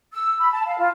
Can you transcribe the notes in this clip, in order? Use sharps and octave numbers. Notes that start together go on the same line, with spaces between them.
E6
B5
A5
F5
F4